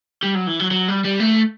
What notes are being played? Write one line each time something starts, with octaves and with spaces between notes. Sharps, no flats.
G3
F#3
E3
F#3
F#3
G3
G3
A3